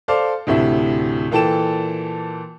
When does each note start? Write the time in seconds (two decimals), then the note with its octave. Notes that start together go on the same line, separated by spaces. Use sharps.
0.08 A4 C5 D5 F5
0.47 D2 A2 C3 E5
1.31 A#2 E3 A4 G5 A5 E7